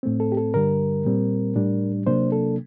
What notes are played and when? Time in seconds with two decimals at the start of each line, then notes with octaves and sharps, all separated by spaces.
0.03 A2 A3 C4
0.20 A4
0.32 G4
0.37 A4
0.54 G2 D3 G3 A#4
1.05 A#2 G3 C4
1.56 A2 G3 D4
2.06 C3 F#3 A#3 D4 C5
2.32 A4